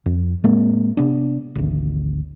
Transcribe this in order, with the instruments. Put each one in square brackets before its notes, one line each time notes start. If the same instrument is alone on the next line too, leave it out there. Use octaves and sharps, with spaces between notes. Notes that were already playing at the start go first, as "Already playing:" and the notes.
[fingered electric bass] F2
A2 G#3 A#3 C4
C3 B3 D4
G#1 D2